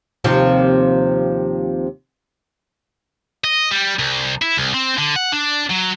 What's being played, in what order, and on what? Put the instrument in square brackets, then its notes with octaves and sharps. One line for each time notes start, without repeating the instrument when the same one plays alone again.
[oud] D#2 C3 F3
[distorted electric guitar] D#5
G3
C2
E4
C2
C4
D3
F#5
D4
F#3